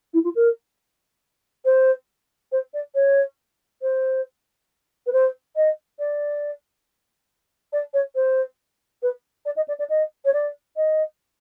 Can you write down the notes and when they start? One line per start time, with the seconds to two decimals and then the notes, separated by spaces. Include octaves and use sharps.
0.13 E4
0.24 F4
0.35 A#4
1.65 C5
2.52 C5
2.73 D5
2.95 C#5
3.82 C5
5.06 B4
5.12 C5
5.56 D#5
5.99 D5
7.72 D5
7.93 C#5
8.15 C5
9.02 B4
9.45 D5
9.56 D#5
9.68 D5
9.79 D5
9.89 D#5
10.25 C#5
10.33 D5
10.76 D#5